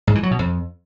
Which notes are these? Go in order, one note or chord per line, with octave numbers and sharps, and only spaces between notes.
G#2
E3
F#3
B2
F2